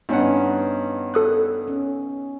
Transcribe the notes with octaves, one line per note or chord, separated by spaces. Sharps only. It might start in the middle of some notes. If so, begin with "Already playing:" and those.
G2 B3 C#4 D#4 F#5
A4 D#6 F#6
C#4